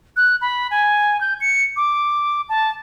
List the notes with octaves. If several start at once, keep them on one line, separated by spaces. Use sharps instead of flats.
F#6
B5
G#5
G6
C#7
D6
A5